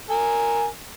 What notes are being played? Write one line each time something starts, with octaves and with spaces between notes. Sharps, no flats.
A#4 G#5